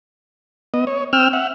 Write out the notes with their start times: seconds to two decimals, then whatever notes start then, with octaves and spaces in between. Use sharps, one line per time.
0.74 B3 D#5
0.87 C#5
1.13 C4 G5 E6 F6
1.33 E5 F#5